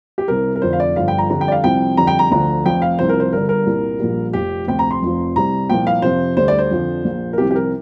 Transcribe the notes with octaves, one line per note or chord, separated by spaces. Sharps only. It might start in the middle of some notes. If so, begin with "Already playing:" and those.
G4
C2 C3 G3 A#4
A#4
F1 F2 D3 F3 C5
F5
D5
G1 G2 D3 F3 F5
G5
A#5
F2 D3 G3 A#5
G5
D5
F5
C2 C3 F3 G5
F2 D3 G3 A#5
G5
A#5
D2 D3 F3 A#5
F1 F2 F3 G5
F5
C2 C3 F3 C5
A#4
C5
G1 G2 D3 A#4
A#4
C2 A#2 G3
A#1 A#2 G3
F1 F2 F3 G4
D2 C3 F3 G5
A#5
C6
F1 F2 F3
C2 C3 G3 A#5
C2 A#2 F3 G5
F5
F2 C3 F3 C5
D2 D3 G3 C5
D5
C5
F2 D3 F3
A#1 A#2 F3
A#4
C2 C3 F3 G4
G4
A#4